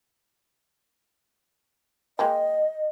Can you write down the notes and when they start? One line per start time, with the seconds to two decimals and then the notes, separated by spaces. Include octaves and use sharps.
2.19 G#3 A#3 D#5 G5